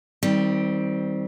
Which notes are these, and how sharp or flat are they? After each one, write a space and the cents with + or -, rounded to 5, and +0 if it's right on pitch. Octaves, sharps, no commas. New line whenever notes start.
D#3 +35 G3 +0 C4 +0